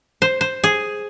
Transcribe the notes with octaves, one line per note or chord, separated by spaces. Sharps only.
C5
C5
G#4